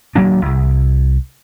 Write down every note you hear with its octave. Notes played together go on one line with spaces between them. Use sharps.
D#1 F#3 A#3 D4
C2